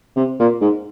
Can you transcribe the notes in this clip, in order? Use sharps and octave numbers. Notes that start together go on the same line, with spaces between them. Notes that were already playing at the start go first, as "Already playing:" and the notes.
C3
A#2
G#2